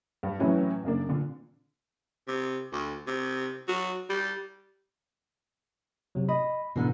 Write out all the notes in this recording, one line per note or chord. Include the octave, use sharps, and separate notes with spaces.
G2
A2 E3 F#3 C#4 E4
F#2 C#3 A#3 D4
A#2 D3
C3
D2
C3
F#3
G3
C3 F#3
D#5 B5
G#2 B2 D3 E3 B3